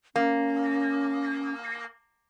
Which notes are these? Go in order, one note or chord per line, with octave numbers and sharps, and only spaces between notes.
A#3 C#4